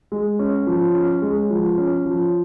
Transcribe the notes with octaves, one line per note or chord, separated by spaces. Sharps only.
G#3
C#4
F3
C#4
G#3
F3
C#4
F3